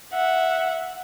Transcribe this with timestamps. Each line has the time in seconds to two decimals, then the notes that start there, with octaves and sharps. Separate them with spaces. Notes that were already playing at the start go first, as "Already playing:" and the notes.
0.14 E5 F#5